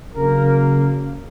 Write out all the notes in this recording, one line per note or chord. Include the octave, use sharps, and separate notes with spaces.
C#3 F#3 A#3 A#4